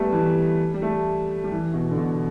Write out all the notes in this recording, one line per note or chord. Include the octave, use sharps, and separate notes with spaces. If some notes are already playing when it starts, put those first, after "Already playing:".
Already playing: G3 A3 B3
E3
G3
A3
G3
E3
B2
D3
B2